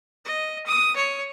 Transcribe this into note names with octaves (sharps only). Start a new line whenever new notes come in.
D#5
D#6
C#5